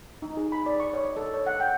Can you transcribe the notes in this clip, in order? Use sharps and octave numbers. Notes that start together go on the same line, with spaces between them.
D#4
G#4
B5
D5
C#6
C#5
D#5
A4
C#5
F#5
G5